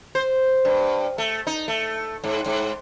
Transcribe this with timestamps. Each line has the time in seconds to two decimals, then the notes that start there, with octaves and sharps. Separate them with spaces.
0.15 C5
0.65 G2
1.18 A3
1.47 D#4
1.68 A3
2.24 G#2
2.46 G#2